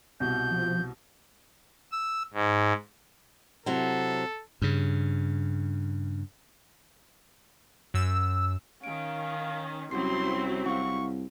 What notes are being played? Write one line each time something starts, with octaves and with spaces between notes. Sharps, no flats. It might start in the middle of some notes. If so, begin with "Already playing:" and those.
C2 B2 G6
F3
E6
G#2
C3 F#3 E4 A4
G2 C#3
F#2 E6
D#3 C#4 F5 D7
C2 F#3 C4 C#4 E4 F#4 C6 C7
C2 F5 F#5 C#6